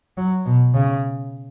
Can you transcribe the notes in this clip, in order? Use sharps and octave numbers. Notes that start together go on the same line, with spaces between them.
F#3
B2
C#3